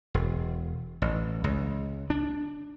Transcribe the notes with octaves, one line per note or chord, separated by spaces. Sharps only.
E1
A1
C#2
D4